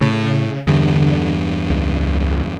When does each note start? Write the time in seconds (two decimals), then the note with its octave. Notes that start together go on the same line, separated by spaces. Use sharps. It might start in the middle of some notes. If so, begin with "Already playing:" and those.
0.01 A2 C#3
0.67 E2 G2 D3
1.70 C#2